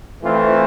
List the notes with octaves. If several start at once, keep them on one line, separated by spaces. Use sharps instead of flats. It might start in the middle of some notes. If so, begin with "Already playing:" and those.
E3 A3 C4 F4